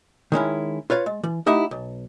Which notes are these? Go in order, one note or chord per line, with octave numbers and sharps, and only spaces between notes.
D#3 G#3 C#4 E4
F4 B4 C#5 F5
G#3
E3
A3 D#4 E4 G4 E5 F#5
B1